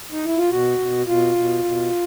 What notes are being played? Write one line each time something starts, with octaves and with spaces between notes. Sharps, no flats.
D#4
E4
F4
B2 F#4
B2
B2 F4
B2
B2